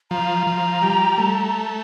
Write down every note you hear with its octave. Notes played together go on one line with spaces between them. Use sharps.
F3 A#5
F3
G3
A3